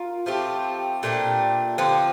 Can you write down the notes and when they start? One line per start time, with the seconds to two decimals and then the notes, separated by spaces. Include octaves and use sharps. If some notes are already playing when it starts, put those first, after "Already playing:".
Already playing: F4 A#4
0.26 F3 A3 C4 G4
1.03 A#2 A3 D4 G4
1.78 D3 F3 C4